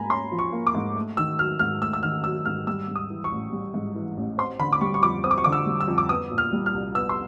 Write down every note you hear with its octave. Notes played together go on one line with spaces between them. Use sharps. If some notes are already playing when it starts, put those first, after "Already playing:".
Already playing: G#2 A#3 G#5 A#5 B5
C#4 C6
F3
C#6
A#3
D6
G#2
A3
D#3 E6
F#3 F6
G#2 F6
A3 E6
E6
D#3 F6
F#3 E6
G#2 F6
G3 E6
G#2
D#6
E3
C#6
A1
G3
G#2
E3
A1
C4 C6
D3 B5
D6
G3 C#6
C#6
F2 D6
C4 D#6
D6
C#6
D3 D6
E6
G3
E6
F2
D6
B3 D#6
A#2
F6
G3
F6
C2
B3 E6
C6